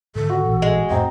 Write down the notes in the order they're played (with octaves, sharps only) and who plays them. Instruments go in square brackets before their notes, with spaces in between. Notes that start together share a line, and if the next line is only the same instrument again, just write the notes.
[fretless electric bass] G#2 D3 D#3 [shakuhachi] A4
[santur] F#4
[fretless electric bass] A1 A#2 E3
[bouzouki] G#3
[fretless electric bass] F2 A2 [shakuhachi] C4 [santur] D#5 G5 A#5